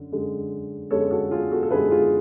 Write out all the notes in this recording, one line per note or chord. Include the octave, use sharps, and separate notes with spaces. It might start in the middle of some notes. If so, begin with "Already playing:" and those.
Already playing: F#2 D3
F#2 D3 G#3
F#2 D3 G#3 A4 C#5
F#4 A4
F4 G#4
F#4 A4
A4
F#2 D3 G#3 G#4 B4
F4 G#4